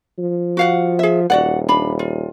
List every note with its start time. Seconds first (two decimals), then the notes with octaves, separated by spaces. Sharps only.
0.18 F3
0.57 F#4 F5 F#5
0.99 G#4 E5
1.30 D#1 F#4 D5 F#5
1.69 D4 B5
1.99 F4